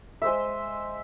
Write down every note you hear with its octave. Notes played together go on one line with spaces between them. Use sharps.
G#3 C5 E5